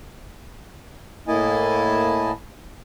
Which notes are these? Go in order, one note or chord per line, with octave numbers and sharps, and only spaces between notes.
A2 A#3 E4 D#5 G#5 A5